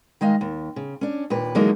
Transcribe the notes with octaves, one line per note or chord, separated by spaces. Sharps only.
D#3 G#3 D#5 F5
D#2
C#3
C#4 D4
D#2 A#2 B4
D3 E3 F#3 G#3 A#3 D#4